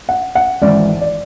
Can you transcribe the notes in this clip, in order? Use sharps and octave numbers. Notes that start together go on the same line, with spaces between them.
F#5
F#5
G#1 G#2 E3 D5
D5